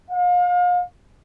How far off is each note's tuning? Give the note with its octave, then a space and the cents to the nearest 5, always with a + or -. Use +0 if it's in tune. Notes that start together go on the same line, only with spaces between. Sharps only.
F5 +35